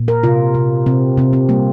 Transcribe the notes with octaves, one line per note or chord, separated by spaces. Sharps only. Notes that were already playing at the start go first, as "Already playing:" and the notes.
Already playing: A#2
A#4
C3 F4
C3
C3 C4
C3 C4
C4
G3 A#3